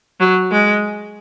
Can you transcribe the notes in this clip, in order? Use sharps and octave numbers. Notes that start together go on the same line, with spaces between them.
F#3
G#3